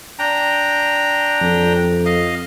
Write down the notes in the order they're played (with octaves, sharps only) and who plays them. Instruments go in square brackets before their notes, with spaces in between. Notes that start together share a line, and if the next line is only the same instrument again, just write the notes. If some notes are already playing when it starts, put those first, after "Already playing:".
[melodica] D4 G5 A#5
[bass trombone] F2
[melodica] D#5 F5